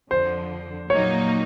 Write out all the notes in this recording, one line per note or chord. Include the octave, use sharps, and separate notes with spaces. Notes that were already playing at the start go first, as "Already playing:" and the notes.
F2 D3 F3 C5
A#2 F#3 A#3 D#4 C#5